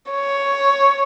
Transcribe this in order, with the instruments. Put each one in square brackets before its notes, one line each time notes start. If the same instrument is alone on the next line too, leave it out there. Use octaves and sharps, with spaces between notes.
[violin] C#5